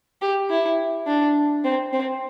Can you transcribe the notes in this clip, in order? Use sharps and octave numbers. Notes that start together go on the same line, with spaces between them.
G4
E4
D4
C4
C4